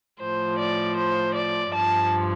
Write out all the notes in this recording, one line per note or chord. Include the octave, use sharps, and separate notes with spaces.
A2 F3 C5
D5
C5
D5
G2 F3 A5